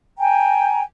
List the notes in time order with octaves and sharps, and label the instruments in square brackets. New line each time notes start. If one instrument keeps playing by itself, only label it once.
[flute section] G5 G#5 A#5